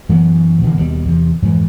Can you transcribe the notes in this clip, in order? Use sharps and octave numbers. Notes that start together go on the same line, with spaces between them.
F#2 E3 F#3 B3
B2 D3 E3 A#3
D#2 B2 G3
E2 C3
F2 G#2 E3